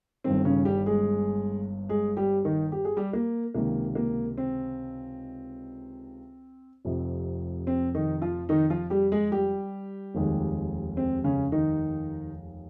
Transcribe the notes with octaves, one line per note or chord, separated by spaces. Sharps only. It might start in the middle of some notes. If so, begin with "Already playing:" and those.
G1 G2 D#3 C4
C#3 C#4
G3 G4
G#3 G#4
G#3 G#4
G3 G4
D#3 D#4
G4
G#4
G3 G4
A#3
C#2 C3 D#3 A#3
A#3
C4
F1 F2 C3
C4
D#3 D#4
F3 F4
D#3 D#4
F3 F4
G3 G4
G#3 G#4
G3 G4
F1 D#2 D#3 G#3
C4
C#3 C#4
D#3 D#4